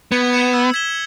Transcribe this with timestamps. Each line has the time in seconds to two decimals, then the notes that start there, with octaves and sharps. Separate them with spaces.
0.12 B3 G#6
0.33 C#7 E7
0.53 E6
0.74 G#6 B6 E7 G7